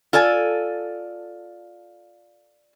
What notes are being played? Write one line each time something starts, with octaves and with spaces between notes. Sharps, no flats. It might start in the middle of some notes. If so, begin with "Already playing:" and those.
F4 A4 D5 G#5